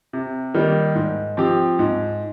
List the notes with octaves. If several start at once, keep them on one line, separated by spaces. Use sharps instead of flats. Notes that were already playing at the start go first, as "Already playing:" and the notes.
C3
D#3 G3 A#3
G#2
F3 C4 G4
G#2